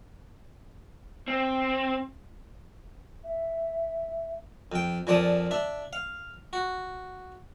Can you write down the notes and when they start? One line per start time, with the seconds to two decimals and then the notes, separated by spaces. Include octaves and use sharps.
1.28 C4
3.23 E5
4.72 F2 G5
5.07 F2 A#2 F3 D5 A5 D#6
5.51 D4 E5
5.93 F5
6.53 F#4